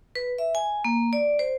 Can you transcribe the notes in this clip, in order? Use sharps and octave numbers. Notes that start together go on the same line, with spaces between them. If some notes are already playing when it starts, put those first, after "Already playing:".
B4
E5
G#5
A#3
D5
C5